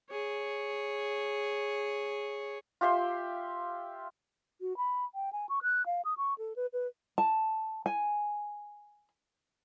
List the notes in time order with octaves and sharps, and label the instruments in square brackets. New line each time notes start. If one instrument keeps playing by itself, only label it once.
[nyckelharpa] G#4 C#5
[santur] F4 G4 E5 C6
[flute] F#4
B5
G5
G#5
C#6
F#6
F5
D#6
C#6
A4
B4
B4
[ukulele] A5
G#5